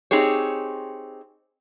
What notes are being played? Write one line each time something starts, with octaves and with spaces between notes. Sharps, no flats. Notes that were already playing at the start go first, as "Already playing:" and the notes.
C4 D#4 G4 G#4 C#5